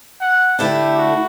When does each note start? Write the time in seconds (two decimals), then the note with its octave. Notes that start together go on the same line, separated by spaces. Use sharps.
0.20 F#5
0.59 D3 A3 E4 G4
0.97 F#4